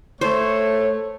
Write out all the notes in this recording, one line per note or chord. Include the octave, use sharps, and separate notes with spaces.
A3 C5 C#5